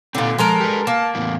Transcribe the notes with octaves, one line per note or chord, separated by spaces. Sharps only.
A#2 D3 C4 D#4 A4
F3 G#3 A4 A#4
G4 B4
A#3 A5
E2 A2 B3